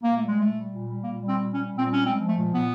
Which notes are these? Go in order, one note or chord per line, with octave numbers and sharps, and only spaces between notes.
A#2 A#3
G3 A3
G#3
A#2 A3
G3
A#2
G3
A#2 A#3
G3
C4
A#2
G3 C#4
A#2
C4
G3
C#4
G#3 C4
F3
A3
A#2
A#2 B3